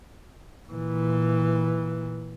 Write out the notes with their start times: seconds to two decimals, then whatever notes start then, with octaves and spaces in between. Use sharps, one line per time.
0.69 A#2 E3